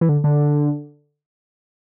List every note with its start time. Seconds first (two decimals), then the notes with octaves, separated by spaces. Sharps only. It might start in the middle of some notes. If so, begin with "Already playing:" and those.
0.01 E3
0.09 D3
0.24 D3